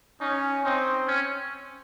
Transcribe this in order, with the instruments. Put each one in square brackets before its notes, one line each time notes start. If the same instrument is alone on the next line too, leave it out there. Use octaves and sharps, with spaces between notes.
[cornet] C#4 [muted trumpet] D#4
[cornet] C4 [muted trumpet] D#4
[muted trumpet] C#4